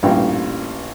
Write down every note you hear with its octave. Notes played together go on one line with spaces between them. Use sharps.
A1 G2 A#2 G5